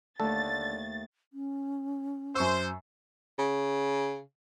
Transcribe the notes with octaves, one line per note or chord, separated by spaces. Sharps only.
D#2 D3 A3 A4 A6
C#4
F#2 C5 C#6 E6
C#3